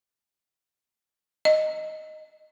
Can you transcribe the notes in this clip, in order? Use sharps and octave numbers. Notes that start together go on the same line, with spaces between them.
D#5